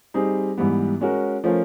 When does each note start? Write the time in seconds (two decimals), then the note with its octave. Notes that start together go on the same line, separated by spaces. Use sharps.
0.14 G3 C4 D#4 G#4
0.57 G#2 E3 G3 B3
1.01 G#3 C#4 F#4 A#4
1.44 F3 A3 C#4 F4 A#4